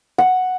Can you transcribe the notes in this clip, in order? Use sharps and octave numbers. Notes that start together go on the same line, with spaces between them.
F#5